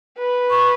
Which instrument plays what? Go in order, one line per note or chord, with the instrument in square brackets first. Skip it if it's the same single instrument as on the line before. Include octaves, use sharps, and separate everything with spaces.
[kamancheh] B4
[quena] C#6